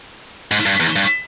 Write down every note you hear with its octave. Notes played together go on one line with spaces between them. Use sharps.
G#2
G2
E2
G2